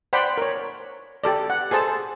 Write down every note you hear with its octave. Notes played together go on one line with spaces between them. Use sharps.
C5 D5 F#5 G5 B5
A#4 C#5
G4 A4 D5
F#5
G#4 A4 C5 A5